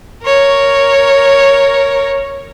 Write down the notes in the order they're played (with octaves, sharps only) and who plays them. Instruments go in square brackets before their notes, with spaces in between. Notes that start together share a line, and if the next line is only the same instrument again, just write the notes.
[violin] A#4 C#5